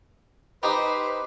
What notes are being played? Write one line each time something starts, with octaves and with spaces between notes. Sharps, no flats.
D#4 G4 B4 C5